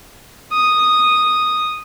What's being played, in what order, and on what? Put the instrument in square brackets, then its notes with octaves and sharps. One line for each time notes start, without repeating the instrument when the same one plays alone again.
[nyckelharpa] D#6